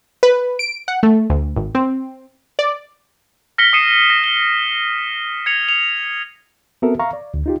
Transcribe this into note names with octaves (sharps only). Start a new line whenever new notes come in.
B4
D7
F#5
A3
D2
G#1
C4
D5
F6 A#6 B6 C#7 G7
D#6 C7 C#7 D#7 E7
A#6
G7
G#6 C#7 F7
F7
B3 C4 F#4 A4 A#4 E5
E5 F5 A#5 C#6
D5
D2
D#4 F4 G4